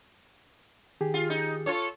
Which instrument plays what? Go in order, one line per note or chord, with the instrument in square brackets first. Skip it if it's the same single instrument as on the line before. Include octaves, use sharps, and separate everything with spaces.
[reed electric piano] D#3 G4 G#4
[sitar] F4
D#4
F4 A4 C#5